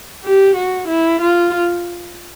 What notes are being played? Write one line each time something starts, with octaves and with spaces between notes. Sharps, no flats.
G4
F#4
E4
F4